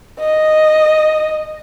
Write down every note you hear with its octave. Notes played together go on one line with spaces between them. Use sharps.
D#5